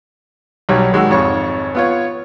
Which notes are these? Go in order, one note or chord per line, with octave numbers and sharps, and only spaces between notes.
B1 F#3 G3 C#5
D#3 G#3 F#4 E6
G#1 F2 C#5 C#6
B3 F4 C#5